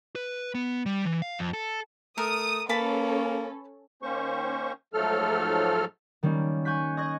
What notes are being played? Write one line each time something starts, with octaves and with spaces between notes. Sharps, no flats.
B4
B3
G3
E3
F5
F2
A4
A3 A#4 D#6
A#3 C#4 A4 B4 A5 B5
D#3 A#3 C#4 C5 C#6
G#2 F3 F#3 A3 A4 F6
D#3 G3 A#3 C#4
G#5 C#6 F#6 G6 B6
D#5 C#6 F#6 G#6 A#6